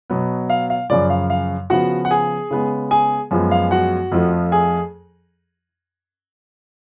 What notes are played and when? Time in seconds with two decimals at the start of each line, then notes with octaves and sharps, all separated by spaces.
0.10 B2 F#3 B3
0.50 F5
0.70 F5
0.90 F#2 C#3 F3 D5
1.10 F5
1.30 F5
1.70 C#3 F3 B3 F#4 F#5
2.05 F#5
2.11 G#4 G#5
2.51 C#3 G#3 B3
2.91 G#4 G#5
3.31 F#2 F3 G#3 B3
3.51 F5
3.71 F#4 F#5
4.12 F2 F3 A3
4.52 G#4 G#5